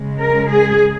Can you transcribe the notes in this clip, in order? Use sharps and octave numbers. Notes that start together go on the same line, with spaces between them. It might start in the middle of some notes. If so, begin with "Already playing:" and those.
Already playing: C#3 G#3
A#4
G#4